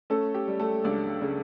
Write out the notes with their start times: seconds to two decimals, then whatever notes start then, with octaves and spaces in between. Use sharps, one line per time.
0.10 A3 C#4 A4
0.34 G4
0.47 G3
0.59 A3 A4
0.84 C#2 D4 D5
1.21 C#3